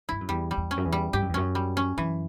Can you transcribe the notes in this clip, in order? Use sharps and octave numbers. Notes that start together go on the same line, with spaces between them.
G2 E4
F#2
E2 G3
G3
E2
C#4
F#2
E2
G3
G2 G4
F#2
E2
F#2 C#4
G3
C#4
F#2 E3